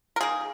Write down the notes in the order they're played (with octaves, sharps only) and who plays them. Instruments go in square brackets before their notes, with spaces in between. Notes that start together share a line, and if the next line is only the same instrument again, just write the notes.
[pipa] A#4
D#3 A#3 G#4